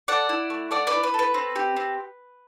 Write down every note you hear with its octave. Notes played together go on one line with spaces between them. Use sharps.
A4 D5 F#5
E4
A3
A3 D5 F#5
B4 D5
E4
B4
A4
B4
C4
G4
C4